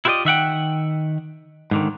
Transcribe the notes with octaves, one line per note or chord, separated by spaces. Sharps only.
E4 F4 G4 B4 D5 D#5
D#3 E5 F#5 G5
G#2 D3 D#3